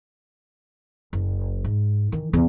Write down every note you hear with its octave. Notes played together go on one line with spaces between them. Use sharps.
F#1
G#2
D#3 E3
E2 C#3